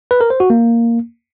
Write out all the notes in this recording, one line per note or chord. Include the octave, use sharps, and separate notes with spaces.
B4
A#4
C5
F#4
A#3